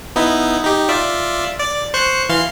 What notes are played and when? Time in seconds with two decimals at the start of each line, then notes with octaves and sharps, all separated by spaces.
0.16 B3 D#4 E4
0.64 D#4 G4
0.89 F4 D5 E5
1.60 D5
1.94 C5 C#6 F#6
2.29 E3 F5 C6